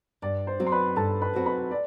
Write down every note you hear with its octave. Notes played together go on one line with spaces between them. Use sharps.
G2 D5
C5
F#3 C4 F#4
C6
B4 B5
G2 A4 A5
B4 B5
F#3 C4 F#4
B4 B5
D5